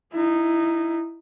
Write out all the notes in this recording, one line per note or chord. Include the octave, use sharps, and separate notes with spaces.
D#4 E4